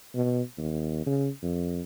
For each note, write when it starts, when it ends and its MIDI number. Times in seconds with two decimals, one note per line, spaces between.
0.15 0.42 47
0.58 1.06 39
1.06 1.28 49
1.43 1.81 41